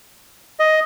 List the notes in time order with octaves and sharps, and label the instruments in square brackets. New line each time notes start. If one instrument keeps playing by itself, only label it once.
[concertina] D#5